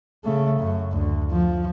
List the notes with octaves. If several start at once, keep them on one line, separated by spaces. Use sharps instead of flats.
C#3 A3
F#2
D2
F3